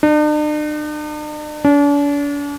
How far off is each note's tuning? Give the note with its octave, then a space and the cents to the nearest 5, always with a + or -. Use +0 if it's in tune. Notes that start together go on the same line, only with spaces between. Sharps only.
D4 +45
D4 -40